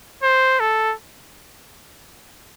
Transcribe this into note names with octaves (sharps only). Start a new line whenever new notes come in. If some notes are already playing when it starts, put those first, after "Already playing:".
C5
A4